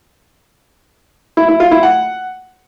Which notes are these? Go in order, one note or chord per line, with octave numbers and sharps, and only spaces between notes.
E4
E4
F4
E4
F#5